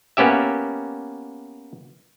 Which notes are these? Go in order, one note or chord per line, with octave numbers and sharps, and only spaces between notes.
A#3 B3 C#4 G4 E5